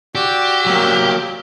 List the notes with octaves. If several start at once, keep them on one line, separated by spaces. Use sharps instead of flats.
F#4 G4 D5 E6
F#3 A#3